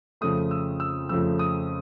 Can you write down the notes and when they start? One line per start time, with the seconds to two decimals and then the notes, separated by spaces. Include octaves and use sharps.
0.21 F2 C#3 F3 A3 D#6
0.51 E6
0.80 E6
1.09 F2 C#3 F3 A3 E6
1.39 D#6